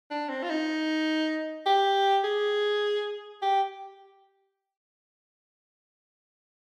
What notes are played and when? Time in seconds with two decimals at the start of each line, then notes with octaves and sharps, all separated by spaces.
0.10 D4
0.29 C4
0.43 F4
0.50 D#4
1.66 G4
2.24 G#4
3.42 G4